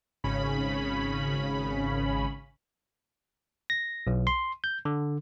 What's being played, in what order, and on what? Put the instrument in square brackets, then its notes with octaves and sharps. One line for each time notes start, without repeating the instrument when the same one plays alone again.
[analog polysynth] G#1 C#3 C#4 B5
[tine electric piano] A#6
B1
C6
G6
D3